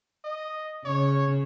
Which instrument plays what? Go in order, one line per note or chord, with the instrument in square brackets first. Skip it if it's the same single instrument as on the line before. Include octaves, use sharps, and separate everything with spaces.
[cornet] D#5
[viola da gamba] C#3 [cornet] C#5